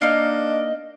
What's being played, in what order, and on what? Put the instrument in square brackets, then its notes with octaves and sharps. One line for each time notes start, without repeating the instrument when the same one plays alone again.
[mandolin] A#3 D#4 F6 [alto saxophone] D4 [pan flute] D#5